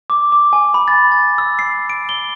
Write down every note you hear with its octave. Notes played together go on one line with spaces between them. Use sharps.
D6
D6
G#5
B5
A6
A6
E6
C7
D7
G7